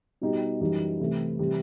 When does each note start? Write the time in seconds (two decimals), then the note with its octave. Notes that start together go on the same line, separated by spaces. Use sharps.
0.21 B2 G3 D#4 G4
0.60 F#2 E3 G3 D#4 G4
1.00 C3 E3 A3 E4
1.39 C3 E3 G3 C4